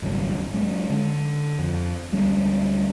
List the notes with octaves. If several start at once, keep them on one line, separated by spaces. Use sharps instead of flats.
G#1 C#2 F#2 G3
F#3 G#3 C#4
D3
F2
D2 G3 G#3 C#4